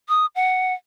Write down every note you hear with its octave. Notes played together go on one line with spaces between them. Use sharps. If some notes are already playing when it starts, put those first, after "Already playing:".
D#6
F#5